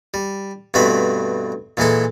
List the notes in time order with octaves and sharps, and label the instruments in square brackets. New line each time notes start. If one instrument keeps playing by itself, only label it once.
[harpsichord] G3
G2 B2 A3 C4 B5
A#2 E3 G#3 A4